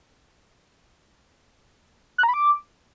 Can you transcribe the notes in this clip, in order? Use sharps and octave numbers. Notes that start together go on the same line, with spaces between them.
F#6
A#5
B5
D6